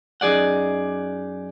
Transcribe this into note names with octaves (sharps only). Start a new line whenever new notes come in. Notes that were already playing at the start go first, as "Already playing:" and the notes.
F#2 D#4 G#4 D5 F#5